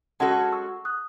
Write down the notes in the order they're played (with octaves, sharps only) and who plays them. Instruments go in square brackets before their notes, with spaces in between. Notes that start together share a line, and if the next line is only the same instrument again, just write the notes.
[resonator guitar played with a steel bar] G#3 C#4 F#4 A4 [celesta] F#5 A5
[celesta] F#5 A5
F#5 A5
C#6 E6
D#6 F#6